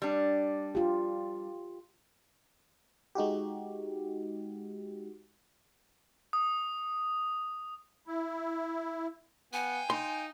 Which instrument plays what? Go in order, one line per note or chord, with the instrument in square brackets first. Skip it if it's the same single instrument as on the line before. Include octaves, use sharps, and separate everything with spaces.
[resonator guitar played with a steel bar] G3 D4
[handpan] F4 G4
[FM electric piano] G#3 D#4 F#4 G4
[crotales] D#6
[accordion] E4
[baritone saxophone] B3 [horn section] F5 G5 [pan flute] G#5
[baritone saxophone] D#4 [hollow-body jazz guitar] C6